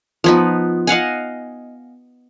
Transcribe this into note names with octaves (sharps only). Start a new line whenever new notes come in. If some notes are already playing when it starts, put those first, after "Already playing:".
F3 B3 D#4
D#5 F5 F#5 G#5